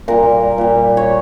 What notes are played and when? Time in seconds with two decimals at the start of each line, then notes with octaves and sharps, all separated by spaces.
0.08 A#2 G3 A#4
0.58 A#2 G3
0.97 C#5